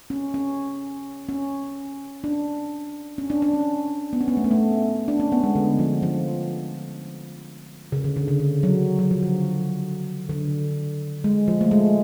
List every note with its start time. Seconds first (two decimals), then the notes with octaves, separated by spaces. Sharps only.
0.10 C#4
0.34 C#4
1.29 C#4
2.24 D4
3.18 C#4
3.30 D4
3.42 D4
3.54 C#4
4.13 B3
4.21 C#4
4.28 B3
4.37 A3
4.44 B3
4.51 A3
5.08 D4
5.20 C#4
5.32 B3
5.44 G#3
5.55 D3
5.79 F3
6.03 F3
7.92 C#3
8.04 D3
8.16 D3
8.28 C#3
8.40 D3
8.63 F#3
8.99 F#3
9.11 F3
9.23 D3
10.29 D3
11.24 G#3
11.48 F3
11.61 A3
11.71 G#3